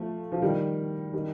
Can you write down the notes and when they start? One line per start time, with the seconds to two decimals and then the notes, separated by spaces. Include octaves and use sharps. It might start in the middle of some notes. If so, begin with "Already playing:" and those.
Already playing: F3 A3
0.32 F3
0.42 D#3 G3
1.13 D#3 G3